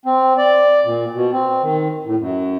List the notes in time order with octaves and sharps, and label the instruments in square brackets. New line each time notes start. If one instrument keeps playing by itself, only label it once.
[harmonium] C4
D5
A#2
B2
C4
D#3
A2
F#2